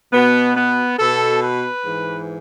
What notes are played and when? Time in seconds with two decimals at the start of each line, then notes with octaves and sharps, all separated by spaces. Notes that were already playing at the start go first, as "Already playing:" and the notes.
0.13 B2 B3
0.56 B3
0.98 B2 A4
1.41 B4
1.84 G#2 E3